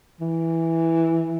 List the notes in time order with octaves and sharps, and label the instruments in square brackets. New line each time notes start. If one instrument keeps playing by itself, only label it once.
[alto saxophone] E3